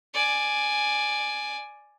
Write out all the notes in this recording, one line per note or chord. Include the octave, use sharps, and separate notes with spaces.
D5 G#5